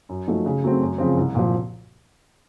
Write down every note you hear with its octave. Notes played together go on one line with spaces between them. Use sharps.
F#2
F3 A3 D#4 F#4
C#3
F#3 A3 C4
F#2
C#3 F3 C4
C2
A#2 F3